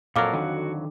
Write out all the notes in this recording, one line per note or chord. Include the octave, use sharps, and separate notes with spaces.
F2 A#2 F#3 A4 A#4 F5 D6 F6
D3 D#3 F#4